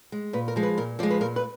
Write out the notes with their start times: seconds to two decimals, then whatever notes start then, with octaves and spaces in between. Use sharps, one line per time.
0.12 G#3
0.33 A#2 B4
0.48 A#4
0.56 F3 G#3
0.63 B4
0.78 A#2 A#4
0.99 F3 D5
1.03 G#3
1.11 B4
1.21 A#2 A#4
1.36 B4